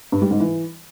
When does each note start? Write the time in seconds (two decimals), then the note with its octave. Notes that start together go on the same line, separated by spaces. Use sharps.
0.12 G2
0.22 G3
0.31 G#2
0.40 E3